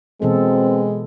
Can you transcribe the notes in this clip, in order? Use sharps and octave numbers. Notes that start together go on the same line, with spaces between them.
B2 E3 G#3 C4 A4